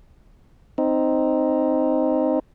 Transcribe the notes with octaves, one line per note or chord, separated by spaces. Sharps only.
C4 D#4